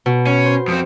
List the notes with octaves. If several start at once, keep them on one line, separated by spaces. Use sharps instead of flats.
B2
C#4
C5
F2 C4